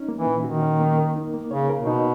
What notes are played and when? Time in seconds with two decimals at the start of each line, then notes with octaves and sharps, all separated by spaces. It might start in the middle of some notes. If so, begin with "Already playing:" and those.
Already playing: C#4 D#4
0.09 A#3
0.17 E3
0.26 A#2
0.44 D#3 F#4
0.62 C#4
0.80 A#3
0.98 A#4
1.16 D#4
1.34 A#3
1.51 C#3 C#5
1.69 A#4
1.78 B2
1.87 D#4